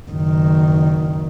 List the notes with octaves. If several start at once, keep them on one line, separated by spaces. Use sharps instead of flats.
F#1 D#3